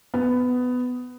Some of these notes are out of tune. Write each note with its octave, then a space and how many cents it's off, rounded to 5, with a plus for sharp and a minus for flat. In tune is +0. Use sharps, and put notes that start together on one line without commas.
B3 +15